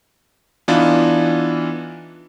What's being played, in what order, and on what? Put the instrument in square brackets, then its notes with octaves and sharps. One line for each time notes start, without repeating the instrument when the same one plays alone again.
[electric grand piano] E3 B3 D4 D#4 F4